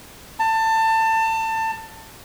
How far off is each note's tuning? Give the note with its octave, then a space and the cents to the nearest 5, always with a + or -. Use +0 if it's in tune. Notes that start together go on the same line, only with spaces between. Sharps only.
A5 +25